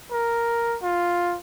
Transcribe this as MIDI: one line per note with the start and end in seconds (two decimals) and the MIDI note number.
0.12 0.77 70
0.83 1.37 65